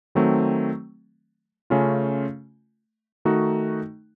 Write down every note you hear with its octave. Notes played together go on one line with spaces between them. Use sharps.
D#3 F#3 A3 C4
C#3 A3 C#4 F4
D#3 A3 D#4 F#4